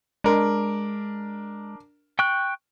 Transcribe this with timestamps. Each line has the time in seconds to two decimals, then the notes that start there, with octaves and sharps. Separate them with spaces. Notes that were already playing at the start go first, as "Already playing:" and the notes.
0.24 G#3 D4 A#4
2.19 G5 C#6 F#6